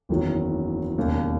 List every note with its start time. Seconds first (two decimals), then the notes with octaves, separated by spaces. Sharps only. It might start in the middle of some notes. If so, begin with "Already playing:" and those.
0.09 F#1 E2 D#3 F#3
0.97 E1 D#2 C#3